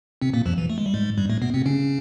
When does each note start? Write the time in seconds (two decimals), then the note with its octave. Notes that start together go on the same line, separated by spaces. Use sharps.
0.22 C3 C4
0.34 A#2 A#3
0.46 F2 F3
0.58 E3
0.70 A3
0.78 G#3
0.86 G3
0.94 G#2 G#3
1.17 G2 G3
1.30 A2 A3
1.42 B2 B3
1.54 C3 C4
1.66 C#3 C#4